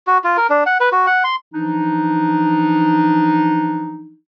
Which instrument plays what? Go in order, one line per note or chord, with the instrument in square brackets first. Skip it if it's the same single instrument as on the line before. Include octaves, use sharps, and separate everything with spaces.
[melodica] F#4
F4
A#4
D4
F#5
B4
F#4
F#5
C6
[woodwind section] E3 F3 D4 D#4